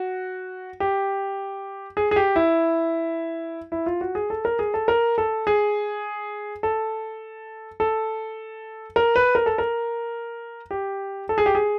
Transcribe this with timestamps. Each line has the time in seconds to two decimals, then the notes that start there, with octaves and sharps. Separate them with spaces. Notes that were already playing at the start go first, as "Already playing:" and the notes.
Already playing: F#4
0.80 G4
1.97 G#4
2.11 G#4
2.16 G4
2.36 E4
3.72 E4
3.86 F4
4.01 F#4
4.15 G#4
4.30 A4
4.45 A#4
4.59 G#4
4.74 A4
4.88 A#4
5.18 A4
5.47 G#4
6.63 A4
7.80 A4
8.96 A#4
9.16 B4
9.35 A#4
9.46 A4
9.58 A#4
10.71 G4
11.29 A4
11.38 G#4
11.46 G4
11.55 G#4